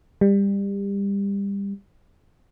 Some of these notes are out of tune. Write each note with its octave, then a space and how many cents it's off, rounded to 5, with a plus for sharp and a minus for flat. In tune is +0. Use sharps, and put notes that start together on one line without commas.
G3 +25